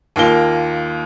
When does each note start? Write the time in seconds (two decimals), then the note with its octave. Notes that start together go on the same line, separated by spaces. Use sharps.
0.16 D#2 A#3 F4 G7